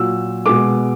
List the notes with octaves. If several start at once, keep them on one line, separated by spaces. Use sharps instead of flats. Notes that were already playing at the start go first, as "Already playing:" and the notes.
Already playing: A#2 F#3 E6
B2 G#3 D6